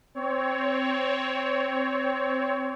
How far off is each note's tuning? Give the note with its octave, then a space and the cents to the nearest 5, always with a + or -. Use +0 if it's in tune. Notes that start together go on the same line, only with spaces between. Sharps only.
C4 +0 C#5 +20